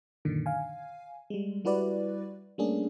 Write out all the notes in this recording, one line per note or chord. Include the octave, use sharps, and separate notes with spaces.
F#2 A#2 D3 D#3
F5 G#5
G3 G#3
G3 E4 F#4 B4 D5
G3 A3 A#3 C#4 D4 G#4